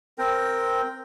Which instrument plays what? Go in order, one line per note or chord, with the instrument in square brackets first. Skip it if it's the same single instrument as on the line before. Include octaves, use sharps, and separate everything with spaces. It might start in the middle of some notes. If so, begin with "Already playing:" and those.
[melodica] C4 A#4 G5